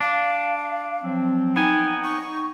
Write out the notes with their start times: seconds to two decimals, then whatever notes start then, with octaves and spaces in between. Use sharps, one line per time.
0.01 D4 F5
1.02 F3 F#3 C4
1.56 B3 D#4 G5 G#5
2.03 C#6